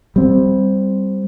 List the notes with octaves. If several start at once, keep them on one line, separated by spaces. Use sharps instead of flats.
G3 C4